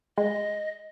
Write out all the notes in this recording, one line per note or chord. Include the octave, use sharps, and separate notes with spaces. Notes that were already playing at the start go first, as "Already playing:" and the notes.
G#3 D#5